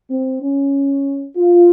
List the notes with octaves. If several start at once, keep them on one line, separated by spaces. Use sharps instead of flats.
C4
C#4
F4